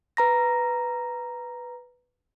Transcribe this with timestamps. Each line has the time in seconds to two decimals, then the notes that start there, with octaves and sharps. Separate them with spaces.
0.17 B4 A#5 A#6